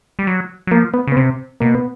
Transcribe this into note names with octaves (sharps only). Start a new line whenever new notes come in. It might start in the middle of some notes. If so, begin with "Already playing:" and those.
G3
F#3
F#3
F3 A#3
B3
C#3
B3
C3 C4
B2 A#3
B3